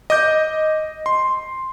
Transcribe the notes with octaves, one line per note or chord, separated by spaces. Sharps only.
D#5 D6 G6
C6